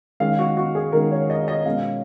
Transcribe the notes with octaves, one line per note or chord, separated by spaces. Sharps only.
D#3 G#3 C#4 F5
F#4
F#4
G#4
D#3 G#3 C#4 A#4
C#5
D#5
D#5
B2 G#3 C#4 F5